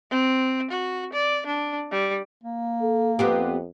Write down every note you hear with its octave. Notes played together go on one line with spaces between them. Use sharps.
C4
F#4
D5
D4
G3
A#3
A4
F2 B3 C4 G4